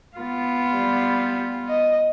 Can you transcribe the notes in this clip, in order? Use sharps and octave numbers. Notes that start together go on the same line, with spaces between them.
B3 F4
G3
D#5